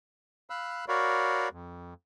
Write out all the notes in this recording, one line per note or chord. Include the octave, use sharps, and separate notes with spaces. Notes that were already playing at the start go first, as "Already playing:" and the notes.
F5 B5 E6 F#6
F#4 A#4 C#5 D5 F5 B5
F2